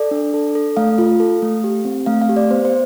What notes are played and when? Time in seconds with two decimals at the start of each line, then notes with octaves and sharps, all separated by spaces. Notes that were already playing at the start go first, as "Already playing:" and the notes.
Already playing: A4 D5
0.11 D4
0.34 A4
0.55 A4
0.77 A3 F5
0.98 F4
1.20 A4
1.42 A3
1.64 G4
1.85 C4
2.06 A3 F5
2.22 F5
2.29 G4
2.36 D5
2.51 B3 C5
2.65 C5